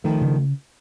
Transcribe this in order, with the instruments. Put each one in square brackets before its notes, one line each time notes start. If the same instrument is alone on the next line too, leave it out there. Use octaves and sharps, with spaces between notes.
[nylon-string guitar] D#3 F3 [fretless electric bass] A3
[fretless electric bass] C#3